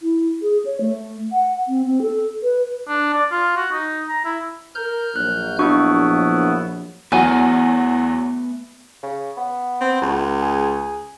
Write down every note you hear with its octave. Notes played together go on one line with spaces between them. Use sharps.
E4
G#4
C#5
A3
F#5
C4
C4
A4
B4
D4
D5
F4
F#4
D#4
A#5
E4
A#4 F6 G6
A#1 F#3 F#6
B3 D4 E4 F#4 C#6
E2 F#3 A3 B3 F#4 G#5
C#3
B3
C4
C#2
G#4